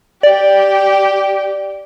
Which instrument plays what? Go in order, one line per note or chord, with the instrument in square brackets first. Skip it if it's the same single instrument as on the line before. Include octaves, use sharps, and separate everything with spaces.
[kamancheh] G4 G5 [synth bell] D5